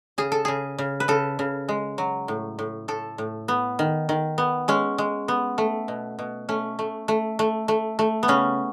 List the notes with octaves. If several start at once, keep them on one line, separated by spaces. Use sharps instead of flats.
C#3 G#4
A4
C#3 G#4
C#3
B4
C#3 A4
C#3
G#3
F#3
A2
A2
A2 A4
A2
B3
D#3
D#3
B3
G#3 C#4
G#3
B3
A3
B2
B2
A3 C#4
A3
A3
A3
A3
A3
B3
C#3 C#4